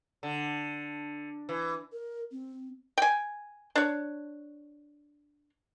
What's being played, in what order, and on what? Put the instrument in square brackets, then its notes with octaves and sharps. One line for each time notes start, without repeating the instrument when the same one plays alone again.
[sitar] D3
E3
[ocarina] A#4
C4
[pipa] G5 G#5
D4 C#5